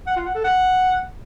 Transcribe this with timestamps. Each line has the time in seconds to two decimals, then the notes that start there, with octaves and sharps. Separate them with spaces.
0.07 F#5
0.16 F4
0.25 F#5
0.35 A4
0.44 F#5